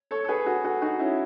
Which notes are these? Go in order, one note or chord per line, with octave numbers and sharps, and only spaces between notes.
A4 C#5
A4
G#4 B4
F#4 A4
F#4 A4
D#4 F#4
C#4 E4